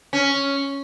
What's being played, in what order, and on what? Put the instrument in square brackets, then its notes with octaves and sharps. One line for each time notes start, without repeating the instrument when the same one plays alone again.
[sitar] C#4